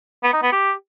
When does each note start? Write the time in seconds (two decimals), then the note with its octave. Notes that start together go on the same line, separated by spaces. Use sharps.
0.23 B3
0.33 D#4
0.42 B3
0.52 G4